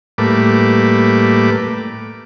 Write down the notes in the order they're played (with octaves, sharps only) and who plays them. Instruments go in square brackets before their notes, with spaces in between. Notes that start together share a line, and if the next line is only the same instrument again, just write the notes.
[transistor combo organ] A2 G3 A3 A#3 B4 D6